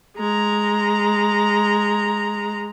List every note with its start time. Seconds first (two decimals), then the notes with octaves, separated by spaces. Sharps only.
0.18 G#3 A#5